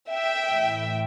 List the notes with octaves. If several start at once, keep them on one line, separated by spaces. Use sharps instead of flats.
E5 G5
A2 E3